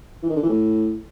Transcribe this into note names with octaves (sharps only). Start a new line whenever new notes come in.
E3
D#3
D3
E3
A2